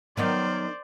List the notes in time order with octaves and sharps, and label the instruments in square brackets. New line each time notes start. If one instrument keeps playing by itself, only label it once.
[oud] D#3 B3 D#4 [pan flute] F#3 [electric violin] C5 D5